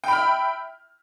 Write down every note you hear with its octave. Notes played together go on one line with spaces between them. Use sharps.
E5 G5 B5 F6